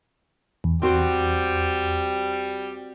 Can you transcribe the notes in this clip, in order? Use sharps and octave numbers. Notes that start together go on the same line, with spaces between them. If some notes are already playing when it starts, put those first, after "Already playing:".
E2
G3 C4 F#4 G4 C5